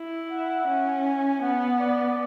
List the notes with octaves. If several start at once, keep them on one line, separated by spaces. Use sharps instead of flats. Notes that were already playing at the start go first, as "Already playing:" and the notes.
Already playing: E4
F#5
C#4
G#5
B3 F#5
D5